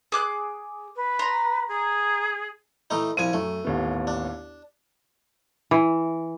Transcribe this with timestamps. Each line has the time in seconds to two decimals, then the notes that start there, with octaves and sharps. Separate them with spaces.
0.12 G#4 D6 F#6
0.96 B4
1.19 A#5 C6
1.68 G#4
2.90 E3 A3 D#4
3.17 C2 F3 G#5 D#7
3.33 F#2 A3
3.65 A1 D#2 B3
4.07 D4
5.71 E3